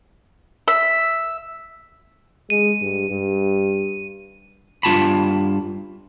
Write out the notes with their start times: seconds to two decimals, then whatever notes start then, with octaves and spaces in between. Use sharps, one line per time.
0.68 E5
2.50 G#3 D#7
2.81 G2
3.10 G2
4.83 G2 F4 A5 B5